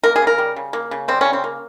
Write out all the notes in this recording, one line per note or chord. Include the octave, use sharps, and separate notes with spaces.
A#3 A#4
G#4
C#3 A#4
G3
C#3
A#3
C#3
G3 C4
C#3 C#4
C4
A#3